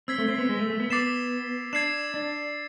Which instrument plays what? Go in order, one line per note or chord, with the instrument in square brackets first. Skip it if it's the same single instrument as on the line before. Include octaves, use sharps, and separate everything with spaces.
[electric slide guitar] C4 [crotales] E6 G#6 B6
[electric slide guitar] A3
C4
B3
G#3
A3
A3
B3
[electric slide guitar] B3 [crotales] D6 A6 C7 E7
[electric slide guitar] D4 [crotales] G#6 C7 E7
[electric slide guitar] D4